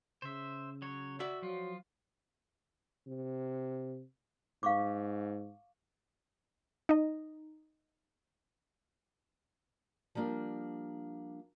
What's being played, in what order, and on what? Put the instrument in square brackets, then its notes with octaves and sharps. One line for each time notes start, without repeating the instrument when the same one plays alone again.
[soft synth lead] C#3 [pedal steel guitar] C5 E5
[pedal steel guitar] F#3 C#5
[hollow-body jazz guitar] F#4 D5 [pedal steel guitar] E5
[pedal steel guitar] F3 F4 [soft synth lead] F#3
[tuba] C3
[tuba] G#2 [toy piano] F5 C#6 D6
[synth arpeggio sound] D#4 D#5
[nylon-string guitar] F3 G3 A#3 D4